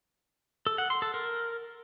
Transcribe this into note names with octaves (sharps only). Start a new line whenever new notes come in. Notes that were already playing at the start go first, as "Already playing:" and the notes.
A4
F#5
C6
A4
A#4